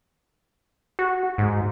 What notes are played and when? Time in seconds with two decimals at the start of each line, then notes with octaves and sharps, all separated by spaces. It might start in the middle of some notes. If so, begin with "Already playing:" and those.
0.99 F#4
1.38 G#2